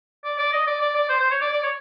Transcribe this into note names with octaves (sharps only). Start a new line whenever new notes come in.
D5
D5
D#5
D5
D5
D5
C5
C5
C#5
D5
D5
C#5